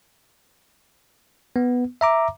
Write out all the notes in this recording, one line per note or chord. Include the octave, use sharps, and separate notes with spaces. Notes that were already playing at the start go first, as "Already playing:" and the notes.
B3
E5 A#5 D6